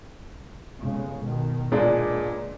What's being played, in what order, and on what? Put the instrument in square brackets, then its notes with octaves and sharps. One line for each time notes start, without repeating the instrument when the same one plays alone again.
[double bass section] G1 C#3 G#3
B2 D#3
[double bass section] C#2 [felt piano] A#2 G#3 D4